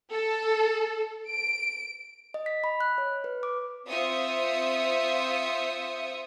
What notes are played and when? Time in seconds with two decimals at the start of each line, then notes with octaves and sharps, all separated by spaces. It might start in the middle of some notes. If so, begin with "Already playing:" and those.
0.11 A4
1.27 D7
2.34 D#5
2.46 B6
2.64 B5
2.80 F#6
2.98 C#5
3.24 B4
3.43 D6
3.88 C4 F4 C5 E5 D#6 C#7